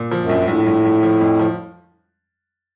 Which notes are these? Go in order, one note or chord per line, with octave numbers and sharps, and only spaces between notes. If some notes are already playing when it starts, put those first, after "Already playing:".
Already playing: A#2
F3
F#2
A#1
A#1 A2
A#1
A#1
F3
F2
F3